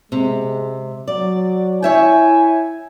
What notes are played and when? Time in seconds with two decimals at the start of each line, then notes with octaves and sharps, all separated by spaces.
0.12 C3 G#3
1.07 F#3 D5
1.82 E4 C#5 E5 G5 G#5